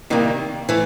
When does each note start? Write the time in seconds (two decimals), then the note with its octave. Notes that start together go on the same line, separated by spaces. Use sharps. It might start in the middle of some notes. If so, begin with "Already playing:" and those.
0.10 C3 D#3 G3 A#3
0.69 E3 A3